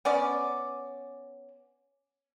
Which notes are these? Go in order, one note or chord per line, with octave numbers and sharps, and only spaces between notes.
B3 C#4 D5